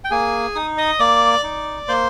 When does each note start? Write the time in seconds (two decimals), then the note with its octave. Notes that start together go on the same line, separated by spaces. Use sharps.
0.04 G5
0.11 A#3 G#4 G#5
0.55 D#4 D#6
0.78 D#5 D#6
0.99 A#3 D5 D6
1.44 D#4
1.88 A#3 C5 C6